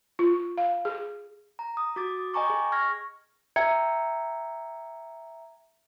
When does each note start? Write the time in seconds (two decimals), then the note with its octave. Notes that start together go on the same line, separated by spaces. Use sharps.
0.19 F4
0.58 F5
0.85 G#4
1.59 A#5
1.77 D#6
1.96 F#4 D6 A6
2.34 D#5 G5 G#5 A#5 C#6 D6
2.50 G#4
2.72 C#6 F6 G#6 A#6
3.56 E5 G5 A#5 G#6 C#7